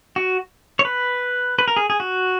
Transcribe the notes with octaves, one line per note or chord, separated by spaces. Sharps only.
F#4
C#5
B4
B4
A#4
G#4
G#4
F#4